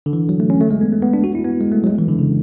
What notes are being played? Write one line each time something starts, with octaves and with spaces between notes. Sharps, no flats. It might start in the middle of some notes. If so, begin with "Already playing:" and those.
D3
E3
F#3
A3
C#4
A3
G#3
B3
A3
B3
D4
F#4
E4
B3
G#3
A3
F#3
G#3
E3
D3
C#3